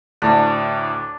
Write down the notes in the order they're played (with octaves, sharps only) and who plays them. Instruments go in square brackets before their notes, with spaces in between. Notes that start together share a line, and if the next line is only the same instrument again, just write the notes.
[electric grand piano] D2 A2 [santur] D4